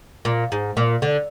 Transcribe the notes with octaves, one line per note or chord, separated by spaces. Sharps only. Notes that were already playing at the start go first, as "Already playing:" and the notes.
A#2
G#2
A#2
D3